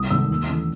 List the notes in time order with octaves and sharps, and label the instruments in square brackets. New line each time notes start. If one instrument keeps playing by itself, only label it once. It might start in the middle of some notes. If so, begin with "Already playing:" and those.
Already playing: [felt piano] C2 D#6
C3 D#3 G#3 E6
D#2
C#3 E3 A3